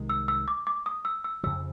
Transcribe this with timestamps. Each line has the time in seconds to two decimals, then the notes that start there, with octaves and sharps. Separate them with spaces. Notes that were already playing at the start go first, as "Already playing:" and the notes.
Already playing: C2 C3 D#3 G#3
0.09 E6
0.28 E6
0.48 D6
0.67 D6
0.86 D#6
1.05 E6
1.24 E6
1.43 F2 C#3 F3 E6